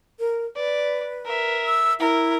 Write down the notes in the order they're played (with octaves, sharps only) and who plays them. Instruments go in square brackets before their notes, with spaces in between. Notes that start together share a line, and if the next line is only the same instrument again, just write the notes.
[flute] A#4
[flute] B4 [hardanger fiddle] D5
[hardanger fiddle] A#4 E5
[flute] E6
[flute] E4 [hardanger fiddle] A#4